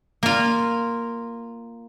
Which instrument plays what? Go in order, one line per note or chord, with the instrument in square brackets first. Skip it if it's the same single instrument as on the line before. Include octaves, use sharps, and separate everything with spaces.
[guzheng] A#3 F4